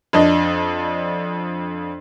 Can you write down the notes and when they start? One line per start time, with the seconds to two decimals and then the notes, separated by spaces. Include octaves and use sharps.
0.13 F2 D4 D#5